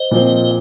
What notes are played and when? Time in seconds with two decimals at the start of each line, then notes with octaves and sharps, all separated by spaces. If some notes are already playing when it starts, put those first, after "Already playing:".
Already playing: C5 D#5
0.11 A#2 F3 C4